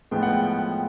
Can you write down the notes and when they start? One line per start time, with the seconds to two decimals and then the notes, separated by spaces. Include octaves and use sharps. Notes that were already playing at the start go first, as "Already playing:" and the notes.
0.11 A2 F3 G#3 B3 G5
0.23 F#5
0.33 G5